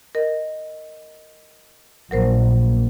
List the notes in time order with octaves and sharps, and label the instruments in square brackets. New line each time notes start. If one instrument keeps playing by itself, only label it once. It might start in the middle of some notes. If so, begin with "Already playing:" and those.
[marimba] A#4 D#5
[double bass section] A#1 A#2 [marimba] F#3 A#4 C5